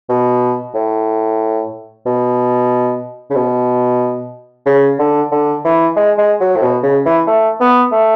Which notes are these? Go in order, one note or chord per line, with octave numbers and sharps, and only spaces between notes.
B2
A2
B2
C#3
B2
C#3
D3
D3
E3
G#3
G#3
F#3
A2
B2
C#3
E3
A3
B3
A3